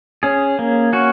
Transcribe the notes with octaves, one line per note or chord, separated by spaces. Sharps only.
C#4 G#4
A#3
C#4 F#4